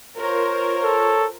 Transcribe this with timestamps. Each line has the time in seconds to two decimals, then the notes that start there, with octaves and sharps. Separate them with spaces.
0.16 F4 A#4 C5 C#5
0.84 A4